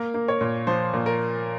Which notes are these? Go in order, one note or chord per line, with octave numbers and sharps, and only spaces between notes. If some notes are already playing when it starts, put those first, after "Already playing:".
Already playing: A#3 A#4
A#3
C#5
A#2
F3 C5
A#2
A#4